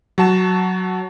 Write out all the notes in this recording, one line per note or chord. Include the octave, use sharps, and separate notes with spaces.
F#3 F#4 A5 E7